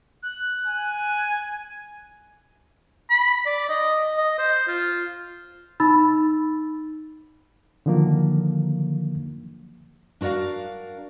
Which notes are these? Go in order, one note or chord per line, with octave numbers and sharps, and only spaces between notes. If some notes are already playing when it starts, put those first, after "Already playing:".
F#6
G#5
B5
D5
D#5
D#5
C5
F4
D#4 B5 E6 A6
D3 D#3 F3 F#3 A#3
D4 F#4 A#4 D5 F5